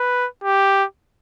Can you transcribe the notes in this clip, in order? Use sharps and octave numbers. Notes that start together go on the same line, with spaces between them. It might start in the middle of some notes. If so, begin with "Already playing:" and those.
Already playing: B4
G4